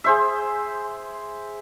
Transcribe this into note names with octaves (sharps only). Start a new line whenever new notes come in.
G#4 C5 E5